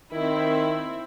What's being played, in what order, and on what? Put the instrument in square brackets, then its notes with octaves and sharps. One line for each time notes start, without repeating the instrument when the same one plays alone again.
[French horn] D#3 [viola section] C4 E4